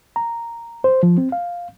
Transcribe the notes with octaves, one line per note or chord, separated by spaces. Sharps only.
A#5
C5
F3
C4
F5